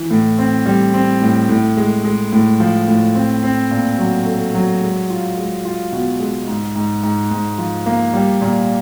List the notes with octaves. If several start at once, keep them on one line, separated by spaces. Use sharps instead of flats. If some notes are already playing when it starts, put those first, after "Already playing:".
Already playing: E3
A2
C4
G3
C4
A2
A2
G#3
G#3
A2
F3
A2
C4
C4
A#2
F#3
A3
F#3
G#3
F4
G#3
F4
B2
G#3
G#2
G#2
G#2
G#2
F3
A#3
G3
A#2